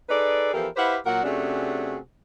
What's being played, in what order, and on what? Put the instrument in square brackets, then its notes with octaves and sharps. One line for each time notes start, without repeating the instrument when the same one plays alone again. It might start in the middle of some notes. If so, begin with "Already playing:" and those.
[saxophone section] D#4 G#4 A4 B4 D5
E3 F3 B3 G4 A4 A#4
E4 G4 B4 C5 F5 F#5
A#2 F#3 A#4 F#5
C3 A3 C#4 D4 F#4 G#4